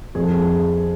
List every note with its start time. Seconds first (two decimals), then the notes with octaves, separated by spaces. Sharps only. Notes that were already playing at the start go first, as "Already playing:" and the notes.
0.15 F2 G#4
0.23 A4
0.30 G#4